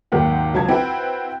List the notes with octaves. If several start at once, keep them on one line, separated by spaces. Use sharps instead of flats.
G#1 D#2 F#3 G4 F#5
C#2 F#3 A5 G#6
C4 E4 F#4 B4